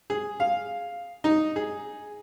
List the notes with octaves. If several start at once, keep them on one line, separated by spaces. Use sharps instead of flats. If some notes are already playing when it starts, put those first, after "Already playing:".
G#4
F5
D#4
G#4